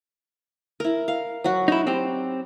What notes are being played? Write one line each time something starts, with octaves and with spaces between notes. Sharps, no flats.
E4 A#4
F5
F#3 F#4
D#4 E4
C4 G4